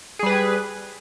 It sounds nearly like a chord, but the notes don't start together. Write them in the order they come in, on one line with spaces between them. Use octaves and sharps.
G#4 G3 B4